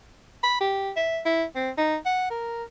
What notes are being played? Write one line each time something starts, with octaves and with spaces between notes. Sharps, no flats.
B5
G4
E5
E4
C4
D#4
F#5
A#4